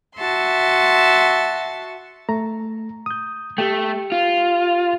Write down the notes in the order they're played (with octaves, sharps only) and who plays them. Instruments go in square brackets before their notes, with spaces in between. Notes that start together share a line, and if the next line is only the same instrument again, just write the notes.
[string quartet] F#4 E5 A5 C6
[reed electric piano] A3 A#5
D#6 G6
[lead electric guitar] A3 [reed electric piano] G4 G5
[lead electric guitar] F4